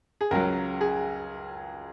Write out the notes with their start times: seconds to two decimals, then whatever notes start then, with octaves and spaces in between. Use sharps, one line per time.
0.21 G#4
0.31 C#2 C#3 F#3 A#4
0.81 G#4